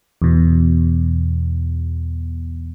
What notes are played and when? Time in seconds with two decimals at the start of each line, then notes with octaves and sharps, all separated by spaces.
0.22 E2 B2